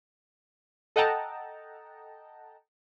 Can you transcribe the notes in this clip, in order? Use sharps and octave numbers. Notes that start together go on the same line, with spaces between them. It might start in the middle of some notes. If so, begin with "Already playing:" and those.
A4 D#5 F#5 G5 A5 A#5